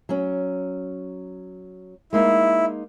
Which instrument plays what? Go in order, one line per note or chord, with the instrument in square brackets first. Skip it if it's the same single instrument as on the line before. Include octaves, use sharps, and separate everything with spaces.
[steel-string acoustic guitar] F#3 C#4
[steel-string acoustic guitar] G#3 A#3 D#4 [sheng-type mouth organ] E4